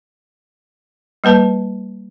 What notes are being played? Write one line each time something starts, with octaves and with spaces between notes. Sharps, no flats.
G3 A#3 B4 A5